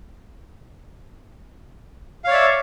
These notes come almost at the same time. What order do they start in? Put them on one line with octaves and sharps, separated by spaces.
F5 C#5 D5 E5